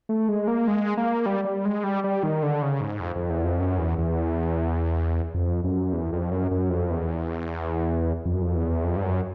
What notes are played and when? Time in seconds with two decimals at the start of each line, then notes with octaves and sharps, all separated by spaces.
0.09 A3
0.29 G#3
0.48 A#3
0.68 G#3
0.97 A#3
1.26 G3
1.45 G3
1.65 G#3
1.84 G3
2.04 G3
2.23 D#3
2.43 D3
2.62 C#3
2.81 G#2
3.00 F2
3.16 F2
3.30 E2
3.44 F2
3.60 F#2
3.78 E2
3.98 E2
5.34 F2
5.64 F#2
5.93 E2
6.13 F2
6.31 F#2
6.51 F#2
6.70 F2
6.90 E2
8.25 F2
8.34 F#2
8.42 F2
8.55 E2
8.84 F2
8.96 G2
9.03 F#2